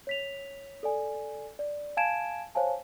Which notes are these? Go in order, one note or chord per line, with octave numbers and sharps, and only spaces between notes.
C#5 B6 F7
A4 D5 G#5
D5
F5 G#5 A5 G#6 D7 E7
C5 C#5 F5 G#5 A5